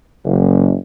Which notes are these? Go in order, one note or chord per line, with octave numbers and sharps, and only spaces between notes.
F#1